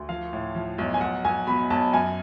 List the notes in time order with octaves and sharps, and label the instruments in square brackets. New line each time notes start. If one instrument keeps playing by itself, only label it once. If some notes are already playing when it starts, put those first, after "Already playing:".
Already playing: [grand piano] D2
F3 F5
A2
F3
B1
G#5
B1 F#5
B1 G#5
B2 B5
B1 A5
F#2 G#5